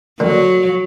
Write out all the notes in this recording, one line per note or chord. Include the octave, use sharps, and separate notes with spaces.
D3 F#3 A#3